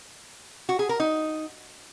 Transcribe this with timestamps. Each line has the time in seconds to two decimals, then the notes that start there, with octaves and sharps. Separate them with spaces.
0.69 F#4
0.79 G#4
0.89 A#4
1.00 D#4